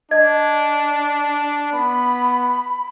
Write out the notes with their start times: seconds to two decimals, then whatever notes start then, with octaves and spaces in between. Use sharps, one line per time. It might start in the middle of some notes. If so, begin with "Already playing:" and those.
0.11 D4 D#5 G#6
1.73 B3 B5